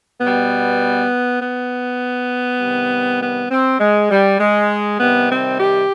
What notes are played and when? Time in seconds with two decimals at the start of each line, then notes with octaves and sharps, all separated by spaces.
0.20 B2 G3 B3
1.40 B3
2.60 C3 D#3 G3
3.20 B3
3.50 C4
3.79 G#3
4.10 G3
4.40 G#3
5.00 C3 D#3 G3 B3
5.30 C4
5.59 G4